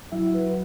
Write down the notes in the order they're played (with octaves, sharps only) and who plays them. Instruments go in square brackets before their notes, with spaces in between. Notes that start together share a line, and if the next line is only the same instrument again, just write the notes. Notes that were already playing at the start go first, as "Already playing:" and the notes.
[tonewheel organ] F#3 [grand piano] E4
[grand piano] B4